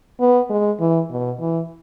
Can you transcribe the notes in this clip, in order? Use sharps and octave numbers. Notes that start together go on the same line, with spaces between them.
B3
G#3
E3
B2
E3